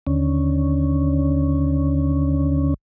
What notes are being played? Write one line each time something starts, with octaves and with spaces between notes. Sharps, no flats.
D#2 D3 C#4